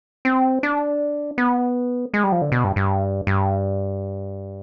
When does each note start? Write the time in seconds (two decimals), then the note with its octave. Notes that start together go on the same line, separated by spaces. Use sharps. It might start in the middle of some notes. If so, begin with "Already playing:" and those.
0.25 C4
0.63 D4
1.38 B3
2.14 G#3
2.24 G3
2.32 F3
2.42 D3
2.52 B2
2.64 G2
2.76 G2
3.27 G2